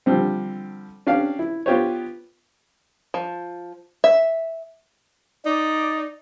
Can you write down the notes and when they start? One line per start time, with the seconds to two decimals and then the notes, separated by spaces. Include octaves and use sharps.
0.06 D3 F3 G3 C4
1.07 C#4 D4 G4 F5
1.39 E4
1.66 B3 F4 G4 C5 C#5
3.14 F3
4.04 E5
5.46 D#4 D5